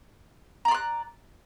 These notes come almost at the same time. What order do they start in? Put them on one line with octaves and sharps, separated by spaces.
A#5 D5 C6 F#6